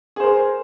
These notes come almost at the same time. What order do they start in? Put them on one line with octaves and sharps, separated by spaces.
G#4 C5 A#4